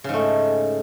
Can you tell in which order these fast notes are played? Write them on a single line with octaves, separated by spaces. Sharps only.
C#3 G#2 A3